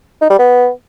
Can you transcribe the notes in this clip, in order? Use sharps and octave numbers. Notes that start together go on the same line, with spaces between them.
D#4
G3
B3